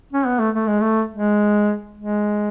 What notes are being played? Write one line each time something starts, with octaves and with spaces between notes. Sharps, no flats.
C#4
B3
A3
A3
G#3
A3
G#3
G#3